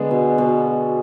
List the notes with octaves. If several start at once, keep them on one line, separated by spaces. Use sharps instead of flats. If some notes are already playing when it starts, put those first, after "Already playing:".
Already playing: D3 G#3 B3 D4
B2
B2